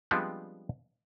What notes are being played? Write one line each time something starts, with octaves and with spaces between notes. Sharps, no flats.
F3 G3 G#3 B3 C4 D4